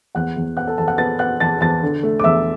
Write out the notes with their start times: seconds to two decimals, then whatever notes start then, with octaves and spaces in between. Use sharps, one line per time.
0.15 E2 F#5 F#6
0.37 E2
0.57 B3 F#5 F#6
0.67 A4 A5
0.78 E2 A4 A5
0.88 F#5 F#6
0.98 B3 A5 A6
1.19 B3 F#5 F#6
1.40 E2 A5 A6
1.61 E2 A5 A6
1.83 D3
2.03 A3
2.20 D6
2.24 E2 E5 E6